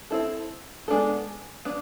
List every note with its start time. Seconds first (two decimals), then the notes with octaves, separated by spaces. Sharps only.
0.10 C4 E4 A4
0.88 G#3 B3 D4 F#4 A4
1.65 B3 D4